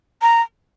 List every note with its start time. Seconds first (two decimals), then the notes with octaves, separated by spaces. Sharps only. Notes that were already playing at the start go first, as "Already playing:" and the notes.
0.22 A#5